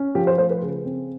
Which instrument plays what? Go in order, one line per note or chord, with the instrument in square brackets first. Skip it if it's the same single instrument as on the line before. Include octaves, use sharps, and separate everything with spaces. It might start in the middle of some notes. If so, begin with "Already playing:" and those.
Already playing: [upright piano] C#4
F3 G4
C5
A3 C5
B4
C#3
C4